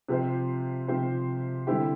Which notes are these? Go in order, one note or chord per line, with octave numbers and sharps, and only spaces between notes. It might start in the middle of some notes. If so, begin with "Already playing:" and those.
C3 F3 C4 G4 C5
C3 F3 C4 G4 C5
D3 G3 C4 E4 G4